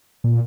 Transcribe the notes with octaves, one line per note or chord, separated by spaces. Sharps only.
A#2